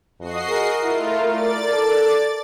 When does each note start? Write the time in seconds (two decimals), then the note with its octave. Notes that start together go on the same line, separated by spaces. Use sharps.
0.20 F2 F#4 D#5 C7
0.49 G#4 A#4
0.83 A3 E4 F4
1.29 D5 A6
1.73 A4